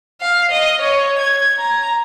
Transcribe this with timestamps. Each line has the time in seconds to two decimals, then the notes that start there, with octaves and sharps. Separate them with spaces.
0.21 F5
0.51 D#5
0.81 C#5
1.18 G#6
1.59 A#5